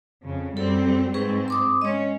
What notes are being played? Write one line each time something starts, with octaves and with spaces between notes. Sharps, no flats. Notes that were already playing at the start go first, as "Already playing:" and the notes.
F2 C#3
F#2 G3 C4 A4
G#2 C4 G#4 B4 C#6
C6 D6 D#6
G#3 C#4 C#5 D#5